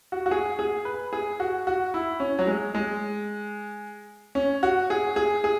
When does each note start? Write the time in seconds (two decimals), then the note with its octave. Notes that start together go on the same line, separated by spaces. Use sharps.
0.12 F#4
0.26 F#4
0.31 G#4
0.59 G#4
0.85 B4
1.13 G#4
1.40 F#4
1.67 F#4
1.94 E4
2.20 C#4
2.39 F#3
2.47 G#3
2.75 G#3
4.35 C#4
4.63 F#4
4.90 G#4
5.16 G#4
5.44 G#4